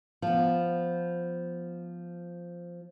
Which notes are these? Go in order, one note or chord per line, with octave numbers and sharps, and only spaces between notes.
F3 B3